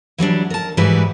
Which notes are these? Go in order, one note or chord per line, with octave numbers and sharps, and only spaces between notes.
E3 F#3 G3 D4
A#4 A5
G#2 E3 G3 E4 F#4 B4